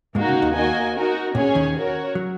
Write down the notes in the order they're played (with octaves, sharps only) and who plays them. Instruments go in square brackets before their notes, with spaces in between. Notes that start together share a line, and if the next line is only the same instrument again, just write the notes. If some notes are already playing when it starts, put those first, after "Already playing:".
[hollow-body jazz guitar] G#2 G#3 [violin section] A#3 D#4 F#4
[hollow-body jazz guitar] C#3
D#2 D#3
[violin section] A#3 F#4 D#5 G#5
D#4 F#4 A#4
[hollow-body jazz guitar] A#2 [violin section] C#4 G#4 C#5 G#5
[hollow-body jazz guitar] D#2 D#3
[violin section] F#4 A#4 C#5
[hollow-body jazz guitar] F#3